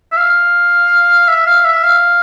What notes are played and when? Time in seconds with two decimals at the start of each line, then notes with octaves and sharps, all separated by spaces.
0.12 E5
0.17 F5
1.28 E5
1.46 F5
1.65 E5
1.83 F5